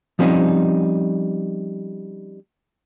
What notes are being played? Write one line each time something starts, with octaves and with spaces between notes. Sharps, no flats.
F3 G3 C4 C#4 D#4